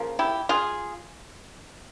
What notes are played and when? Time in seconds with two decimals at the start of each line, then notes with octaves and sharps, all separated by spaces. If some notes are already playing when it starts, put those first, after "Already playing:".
Already playing: C#3 F3 A#3
0.19 E4 G4
0.49 F4 G#4